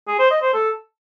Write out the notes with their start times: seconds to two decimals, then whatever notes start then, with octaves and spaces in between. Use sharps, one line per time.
0.07 G#4
0.19 C5
0.30 D#5
0.42 C5
0.53 A4